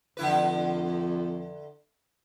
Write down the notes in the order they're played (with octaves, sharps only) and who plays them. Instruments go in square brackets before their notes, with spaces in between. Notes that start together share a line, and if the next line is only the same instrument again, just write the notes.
[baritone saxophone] F2 [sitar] D3 E4 B4